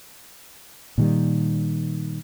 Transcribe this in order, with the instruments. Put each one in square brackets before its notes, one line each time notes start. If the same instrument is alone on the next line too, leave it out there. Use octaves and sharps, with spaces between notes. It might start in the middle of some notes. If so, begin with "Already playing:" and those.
[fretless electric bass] A#2 D#3 G3